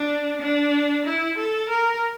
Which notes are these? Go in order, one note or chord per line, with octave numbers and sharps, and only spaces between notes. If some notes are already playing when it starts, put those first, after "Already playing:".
Already playing: D4
D4
E4
A4
A#4